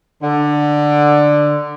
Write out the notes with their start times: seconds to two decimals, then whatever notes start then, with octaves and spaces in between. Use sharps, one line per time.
0.23 D3